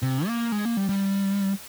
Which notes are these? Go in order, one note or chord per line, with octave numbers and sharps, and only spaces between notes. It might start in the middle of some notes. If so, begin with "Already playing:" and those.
C3
A#3
G#3
A#3
G3
G3